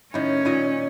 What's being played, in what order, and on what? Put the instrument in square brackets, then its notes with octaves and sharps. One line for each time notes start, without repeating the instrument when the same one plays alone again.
[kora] A2 D#3 [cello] C#4
[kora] A#2 D#3 D#5